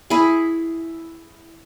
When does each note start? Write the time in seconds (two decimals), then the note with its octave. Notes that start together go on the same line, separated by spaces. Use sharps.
0.10 E4 G#4